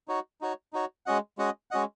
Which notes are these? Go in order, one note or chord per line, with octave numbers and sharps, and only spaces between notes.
D#4 F#4 C#5
D#4 F#4 C#5
D#4 F#4 C#5
G#3 C#4 F#4 D#5 F#5
G#3 C#4 F#4 D#5 F#5
G#3 C#4 F#4 D#5 F#5